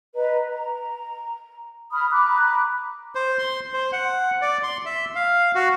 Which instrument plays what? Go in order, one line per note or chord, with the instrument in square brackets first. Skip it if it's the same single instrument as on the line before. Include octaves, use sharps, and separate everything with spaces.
[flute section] B4 D#5 A#5
A#5
B5 D#6 F6
A#5 B5 D6 F#6
[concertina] C5
C6
C5
F#5
D5
C6
E5
F5
F#4